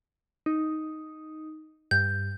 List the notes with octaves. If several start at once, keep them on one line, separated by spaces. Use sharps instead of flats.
D#4
G2 G6